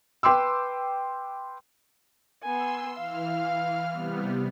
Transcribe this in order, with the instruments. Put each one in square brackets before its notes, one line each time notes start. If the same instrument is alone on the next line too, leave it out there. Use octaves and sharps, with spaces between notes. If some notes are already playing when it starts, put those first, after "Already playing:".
[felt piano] B4 G5 C6 D6 E6
[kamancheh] B3 G#5 [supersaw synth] C6 E6
[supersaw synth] E3 F6 [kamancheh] F5
[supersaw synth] C3 G3 B3